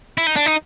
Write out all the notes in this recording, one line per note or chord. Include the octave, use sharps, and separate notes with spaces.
E4
D#4
D4
D#4